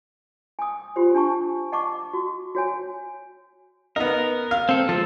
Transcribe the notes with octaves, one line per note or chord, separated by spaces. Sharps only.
G#5 D#6
F4 G4 C5
D4 G#5 A5 C#6
D#5 F#5 A5 C#6 D6
F#4
F#4 C#5 G#5
B3 D#4 A#4
F5
C4 A4
F3 G#3 A4